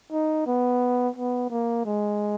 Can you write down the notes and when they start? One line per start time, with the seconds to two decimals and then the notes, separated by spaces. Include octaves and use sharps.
0.12 D#4
0.46 B3
1.16 B3
1.50 A#3
1.85 G#3